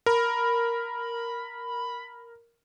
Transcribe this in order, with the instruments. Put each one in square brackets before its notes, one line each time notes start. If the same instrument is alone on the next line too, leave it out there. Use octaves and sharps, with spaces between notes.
[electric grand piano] A#4 [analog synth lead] B5